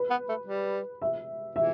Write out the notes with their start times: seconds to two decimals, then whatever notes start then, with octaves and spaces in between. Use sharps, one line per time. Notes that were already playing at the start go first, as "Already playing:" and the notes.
Already playing: B4
0.10 B3
0.29 A3
0.47 G3
1.02 E5
1.55 E3 E5